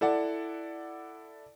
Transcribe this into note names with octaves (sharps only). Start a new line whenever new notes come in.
E4 A4 D5 F#5